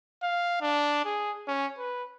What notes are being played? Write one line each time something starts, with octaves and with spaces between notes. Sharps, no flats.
F5
D4
G#4
C#4
B4